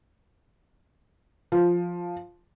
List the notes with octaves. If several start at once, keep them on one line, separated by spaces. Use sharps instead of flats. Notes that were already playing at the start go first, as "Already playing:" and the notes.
F3